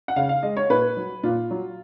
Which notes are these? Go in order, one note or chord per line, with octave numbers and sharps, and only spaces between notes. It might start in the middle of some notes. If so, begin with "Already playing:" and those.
F#5
C#3 F5
F5
G#3 D#5
C#5
A#2 B4
F#3
A#2 F4
F#3